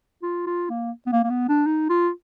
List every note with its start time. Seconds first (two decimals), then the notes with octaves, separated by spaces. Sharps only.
0.22 F4
0.46 F4
0.69 A#3
1.06 B3
1.12 A#3
1.24 A#3
1.30 B3
1.48 D4
1.66 D#4
1.89 F4